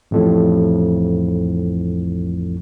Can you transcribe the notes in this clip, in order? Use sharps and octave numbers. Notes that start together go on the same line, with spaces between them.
A1 F2 A2